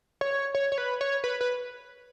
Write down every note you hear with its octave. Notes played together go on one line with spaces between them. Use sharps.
C#5
C#5
C#5
B4
C#5
B4
B4